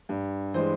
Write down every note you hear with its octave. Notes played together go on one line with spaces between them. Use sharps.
G2
E3 G#3 C5